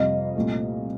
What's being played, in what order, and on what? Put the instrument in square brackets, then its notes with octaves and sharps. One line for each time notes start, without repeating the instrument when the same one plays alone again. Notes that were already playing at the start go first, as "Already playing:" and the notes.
Already playing: [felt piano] F2 C3 G3 [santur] D#5 F5
[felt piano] C2 A#2 A3